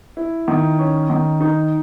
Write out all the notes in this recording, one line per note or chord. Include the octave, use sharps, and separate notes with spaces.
E4
D#3
C#4
D#3
D#4